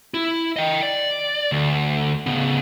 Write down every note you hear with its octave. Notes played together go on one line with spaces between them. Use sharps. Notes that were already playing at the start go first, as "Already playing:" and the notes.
E4
D#5 G5
D5
D2
C#3 B3